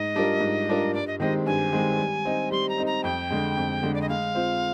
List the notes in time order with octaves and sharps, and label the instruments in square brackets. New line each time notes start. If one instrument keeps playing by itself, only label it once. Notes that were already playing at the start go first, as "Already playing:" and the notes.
Already playing: [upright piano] G#2 [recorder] D#5
[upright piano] G3 D4 F4 A#4
G#2
G3 D4 F4 A#4
[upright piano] G2 [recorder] D5
[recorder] D#5
[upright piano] D#3 G#3 C4 G4 [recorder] D#5
[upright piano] G2 [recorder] G#5
[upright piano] D#3 G#3 C4 G4
G3
C4 D#4
[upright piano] G3 [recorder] C6
[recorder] A#5
[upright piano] C4 D#4
[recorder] A#5
[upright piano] F2 [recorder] G5
[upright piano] D3 G#3
F2
D3 G#3
[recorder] D5
D#5
[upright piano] G#3 [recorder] F5
[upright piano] C4 F4 C5